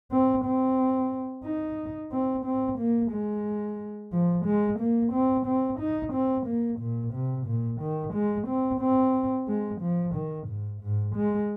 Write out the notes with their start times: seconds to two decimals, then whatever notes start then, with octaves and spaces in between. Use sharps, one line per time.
0.11 C4
0.45 C4
1.44 D#4
2.12 C4
2.45 C4
2.79 A#3
3.12 G#3
4.12 F3
4.46 G#3
4.80 A#3
5.13 C4
5.46 C4
5.80 D#4
6.13 C4
6.47 A#3
6.80 A#2
7.14 C3
7.47 A#2
7.81 D#3
8.14 G#3
8.48 C4
8.81 C4
9.48 G#3
9.81 F3
10.15 D#3
10.48 G#2
10.82 G#2
11.16 G#3